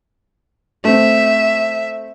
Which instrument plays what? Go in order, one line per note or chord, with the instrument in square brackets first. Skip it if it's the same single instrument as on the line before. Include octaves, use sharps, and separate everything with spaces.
[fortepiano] A3 C4 [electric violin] E5